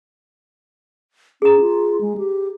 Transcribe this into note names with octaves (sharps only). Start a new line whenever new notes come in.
C#4 G#4 A#5
F4
G#3
G4